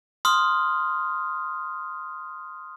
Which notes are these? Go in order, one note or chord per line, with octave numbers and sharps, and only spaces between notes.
C6 D#6 F6